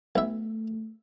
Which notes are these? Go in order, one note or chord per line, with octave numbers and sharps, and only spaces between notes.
B1 A3 E5